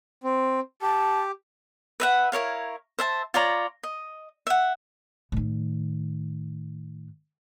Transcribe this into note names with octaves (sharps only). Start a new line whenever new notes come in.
C4
G4 A5
B4 E5 F#5
E4 A#4 C#5 F5
C5 E5 A5
F4 C#5 D5 A#5
D#5
E5 F#5
A2 D#3